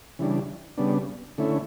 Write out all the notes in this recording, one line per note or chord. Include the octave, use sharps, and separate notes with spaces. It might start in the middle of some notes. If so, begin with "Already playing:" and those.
C#3 E3 G3 D4
C#3 G3 B3 D4
D3 A3 C#4 E4